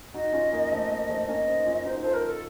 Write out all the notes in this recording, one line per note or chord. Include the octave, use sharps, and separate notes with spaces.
D#4 F#4 D#5
C#4 F4
A#3 C#4
A3 C4
A#3
A3 C4
C4
A#3 C#4 D#5
C4 D#4
C#4 F4
D#4 F#4 C5
F4 A4 C5
A#4
A4